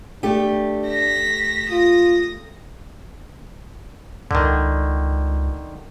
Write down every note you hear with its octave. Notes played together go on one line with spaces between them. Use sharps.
A3 D4 G4
A#6 B6
F4 D#6 A#6
C#2 D3 D#3